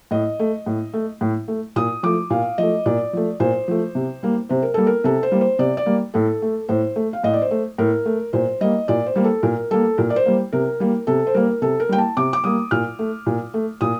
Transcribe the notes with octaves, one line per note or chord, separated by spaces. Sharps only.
A2 D#5
A3
A2
A3
A2
A3
A#2 D#6
F3 A3 D6
A#2 F5
F3 A3 D#5
A#2 D5
F3 A3
A#2 C5
F3 A3
C3
G3 A#3
C3 C5
A#4
G3 A#3 A4
A#4
C3 A4
C5
G3 A#3
C5
C3 D5
D5
G3 A#3
A2 A4
A3
A2 C5
A3
F5
A2 D#5
D5
C5
A3
A2 A#4
A3
A#2 C5
G3 A#3 D#5
A#2 D5
C5
G3 A#3
A4
A#2 A#4
G3 A#3 A4
A#2 A#4
D5
C5
G3 A#3
C3 A#4
G3 A#3
C3 A4
C5
G3 A#3 A#4
C3 A4
A#4
G3 A#3 G5
A5
C3 D6
D6
G3 A#3 D#6
A#2 F6
A3
A#2
A3
A#2 D#6